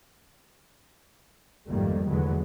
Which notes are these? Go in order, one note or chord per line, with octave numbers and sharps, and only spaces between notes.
G#1 F2 D#3 G3 A3 A#3
F1 E2 D3 F#3 G#3 B3